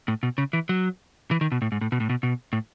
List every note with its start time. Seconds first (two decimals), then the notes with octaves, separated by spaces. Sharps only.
0.08 A2
0.23 B2
0.38 C#3
0.53 E3
0.69 F#3
1.31 E3
1.41 D#3
1.52 B2
1.62 A2
1.72 G#2
1.81 A2
1.92 B2
2.00 A2
2.10 B2
2.23 B2
2.53 A2